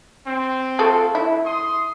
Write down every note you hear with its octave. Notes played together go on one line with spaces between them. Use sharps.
C4
F3 A3 A4
E4
C6 D#6